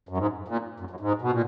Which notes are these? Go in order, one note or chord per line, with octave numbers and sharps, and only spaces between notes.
F#2
G#2
A#2
F#2
F#2
G#2
B2
A#2